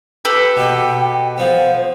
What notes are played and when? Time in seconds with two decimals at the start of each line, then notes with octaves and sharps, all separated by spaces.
0.25 G4 A4 B4
0.57 B2 G5
1.38 F3 B3 C5